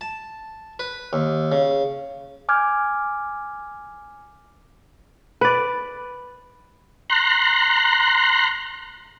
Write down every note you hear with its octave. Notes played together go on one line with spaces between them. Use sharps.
A5
B4
D#2
C#3
G#5 D6 F6 G6 G#6
B4 D5
A#5 C6 F#6